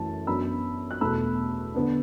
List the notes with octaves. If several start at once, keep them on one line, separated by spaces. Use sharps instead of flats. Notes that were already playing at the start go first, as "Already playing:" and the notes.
Already playing: F#2 E3 A3 A5
F#2 F#3 B3 D4 B5 E6
F#6
E2 B2 A3 B5 E6
D3 B3 D4